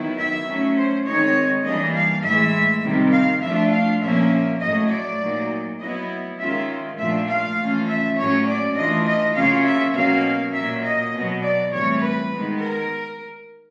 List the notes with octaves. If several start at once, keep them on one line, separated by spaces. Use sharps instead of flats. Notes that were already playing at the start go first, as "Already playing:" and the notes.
Already playing: D#3 F#3 B3 E4
E5
F#3 A3 C#4
C5
D#3 G#3 C4 D#4 C#5
E3 G3 A#3 D4 D#5
F5
A2 E3 G#3 E5
C3 D#3 G3 C4
F5
F3 A3 D4 F4 E5
F5
A#2 F3 A#3 C#4 E5
A2 F#3 A3 D#5
D5
A#2 F#3 A#3 D#4
F#3 B3 E4 D#5
D#3 G#3 C#4 F4 E5
A#2 F3 A3 D4 F4 E5
F5
E3 A3 C#4 F4
E5
A2 F#3 A#3 C#4 C#5
D5
E3 A3 D4 F4 D#5
D#5
C#3 F#3 A#3 C#4 F4 F5
E5
B2 F#3 A#3 C#4 F5
A#2 F#3 A#3 E5
D#5
B2 F#3 B3
D5
A2 E3 G3 C4 C#5
B4
D#3 G#3 B3
A#4